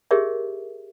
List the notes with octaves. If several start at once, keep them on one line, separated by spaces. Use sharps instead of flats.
G4 G#4 A#4 C#5 D#5 E5